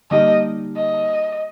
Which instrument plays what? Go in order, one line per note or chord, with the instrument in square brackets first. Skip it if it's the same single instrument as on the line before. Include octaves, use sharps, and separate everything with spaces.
[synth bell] D3 G3 A#3 D#4 G4 [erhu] D#5
[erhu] D#5